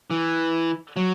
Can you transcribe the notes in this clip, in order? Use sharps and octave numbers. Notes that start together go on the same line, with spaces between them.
E3
F#3